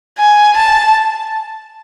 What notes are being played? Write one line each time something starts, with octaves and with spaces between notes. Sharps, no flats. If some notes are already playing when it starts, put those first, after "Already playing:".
G#5
A5